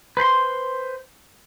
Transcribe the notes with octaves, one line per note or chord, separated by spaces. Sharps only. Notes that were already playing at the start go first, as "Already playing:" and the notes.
B4 C5 B5 C6